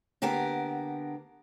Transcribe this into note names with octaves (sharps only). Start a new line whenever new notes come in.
D3 A#3 B3 G4 A#4